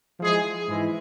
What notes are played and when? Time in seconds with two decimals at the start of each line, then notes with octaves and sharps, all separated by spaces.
0.19 F3 G#3 E4 G#4
0.67 G#2 E3 G#3 E4